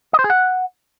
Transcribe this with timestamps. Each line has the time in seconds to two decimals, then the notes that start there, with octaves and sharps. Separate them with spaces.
0.13 D#5
0.19 C5
0.24 G#4
0.30 F#5